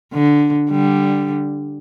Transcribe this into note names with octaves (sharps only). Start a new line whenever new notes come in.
D3
D3 G3